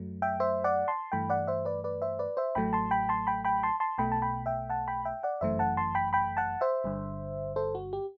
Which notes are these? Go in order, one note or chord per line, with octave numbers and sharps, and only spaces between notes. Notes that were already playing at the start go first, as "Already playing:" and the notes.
Already playing: F#2 F#3 A3
E5 G5
C5 E5
D5 F#5
A5 C6
G2 E3 A3 G5 B5
D5 F#5
C5 E5
B4 D5
B4 D5
C5 E5
B4 D5
C5 E5
A1 A2 F#3 A3 G5 B5
A5 C6
G5 B5
A5 C6
G5 B5
G5 B5
A5 C6
A5 C6
B1 B2 A3 G5 B5
A5
G5 B5
E5 G5
F#5 A5
G5 B5
E5 G5
D5 F#5
G1 F#2 E3 A3 C5 E5
F#5 A5
A5 C6
G5 B5
G5 B5
F#5 A5
C5 E5
G1 G2 D3
A4 C5
F#4
G4